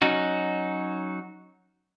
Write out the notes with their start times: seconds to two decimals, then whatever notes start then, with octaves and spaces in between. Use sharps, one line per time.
0.02 F#3 C#4 D#4 F#4